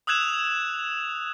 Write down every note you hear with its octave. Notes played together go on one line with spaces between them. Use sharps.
D#6 E6 F#6 G#6 E7 F7